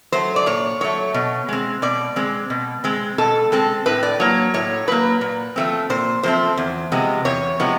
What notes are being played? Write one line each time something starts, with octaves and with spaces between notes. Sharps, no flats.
F#3 A3 C5
D5
A#2 C#5
F#3 A3 C#5
B2
G#3 C4
B2 D5
G#3 C4
B2
G#3 C4
B2 A4
G#3 C4 A4
A2 B4
D5
F#3 A#3 C#5
A2 C#5
F#3 A#3 B4
A#2
F3 A3 C4
A#2 C5
F3 A3 C4 C5
E2
C3 F3 G#3 B3
E2 C#5
C3 F3 G#3 B3